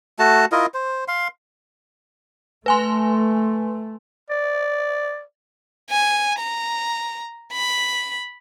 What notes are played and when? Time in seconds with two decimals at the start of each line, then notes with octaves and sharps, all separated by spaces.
0.19 A3 F#4 A5
0.52 E4 F4 A#4 D#5
0.74 C5
1.08 F5 C6
2.66 A3 B4 G#5 C6
4.30 D5
5.90 G#5
6.39 A#5
7.53 B5